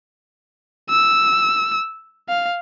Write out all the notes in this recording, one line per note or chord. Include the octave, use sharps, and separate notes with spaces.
E6
F5